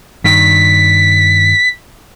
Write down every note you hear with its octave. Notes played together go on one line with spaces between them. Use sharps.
G2 D#3 B6